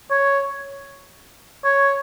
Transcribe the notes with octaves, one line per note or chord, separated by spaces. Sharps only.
C#5
C#5